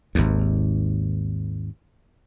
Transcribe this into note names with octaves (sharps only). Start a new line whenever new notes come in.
G#1 D#2